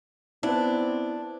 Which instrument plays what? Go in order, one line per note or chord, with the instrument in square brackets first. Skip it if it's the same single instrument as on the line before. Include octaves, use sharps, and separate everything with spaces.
[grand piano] B3 E4 [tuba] C4 [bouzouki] D4